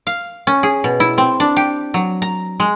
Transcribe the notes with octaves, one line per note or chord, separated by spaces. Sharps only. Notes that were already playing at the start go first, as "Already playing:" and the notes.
F5
C#4
G#4
B2
E4
C4
D4
G4
F#3
A#5
G#3